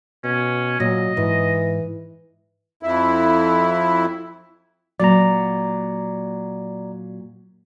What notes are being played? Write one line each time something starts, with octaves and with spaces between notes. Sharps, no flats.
B2 C#4
A#2 F#3 D#5
G#2 E3
F2 E4
A#2 F#3 D5 A#5